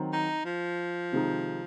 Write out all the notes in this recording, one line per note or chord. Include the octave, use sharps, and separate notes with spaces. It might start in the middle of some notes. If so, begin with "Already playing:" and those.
Already playing: D#3 F#3 C4
D#4
F3
C3 D#3 G#3 D#4